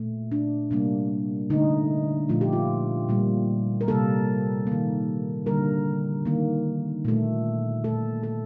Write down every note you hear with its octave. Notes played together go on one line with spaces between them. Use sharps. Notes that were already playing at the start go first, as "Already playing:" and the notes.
Already playing: A#2 A3
D4
C3 G3 A#3 D4
D3 A3 D#4
A#2 F3 A3 F4
G4
F4
A#2 G3 A#3
A#4
C3 G3 A#3 A4
D#3 A#3
D3 G3 A#3 A#4
D#3 A#3
A#2 A3
A#2 A3 A4
A4